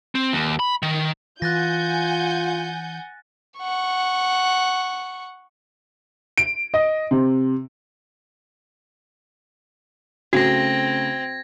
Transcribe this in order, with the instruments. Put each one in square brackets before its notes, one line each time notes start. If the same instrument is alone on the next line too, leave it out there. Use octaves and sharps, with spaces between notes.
[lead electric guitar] C4
D#2
B5
D#3
[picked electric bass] E3 [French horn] F4 [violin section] F#5 G#5 G6 [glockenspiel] F#6 A6 A#6
[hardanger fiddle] F#5 C#6
[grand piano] D7
D#5
C3
[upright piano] C#3 A3 [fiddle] C4 [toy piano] F#4 [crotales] G#6 A#6